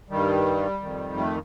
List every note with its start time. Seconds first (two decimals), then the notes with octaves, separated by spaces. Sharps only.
0.10 G2 D#3 G3
0.82 F2 D#3
1.18 A3